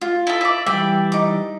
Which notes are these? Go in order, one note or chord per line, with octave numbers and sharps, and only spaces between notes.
F4
E4 A4
D5 E5
E3 G3 D5 E5 G5
D#4 D6